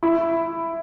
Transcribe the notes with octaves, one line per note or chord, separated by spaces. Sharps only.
E4